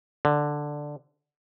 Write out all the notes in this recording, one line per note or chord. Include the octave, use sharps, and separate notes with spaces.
D3